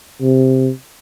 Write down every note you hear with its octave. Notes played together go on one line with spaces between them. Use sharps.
C3